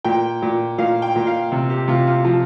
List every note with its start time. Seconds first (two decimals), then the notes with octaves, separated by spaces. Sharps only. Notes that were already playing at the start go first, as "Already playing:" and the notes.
0.04 A#2 G5
0.42 A#2
0.78 A#2 F5
1.02 G5
1.16 A#2
1.27 F5
1.52 C3
1.70 G4
1.88 C3 F4
2.07 F4
2.24 F3 F4